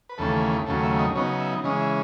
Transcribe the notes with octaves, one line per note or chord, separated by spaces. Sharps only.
B4
D#2 C#3 E3 A3 A4
D#2 C#3 F#3 A3 A4
E5
D#5
C#3 F#3 B3 D#4 C#5
E5
C#3 E3 G#3 C#4 D#5
E5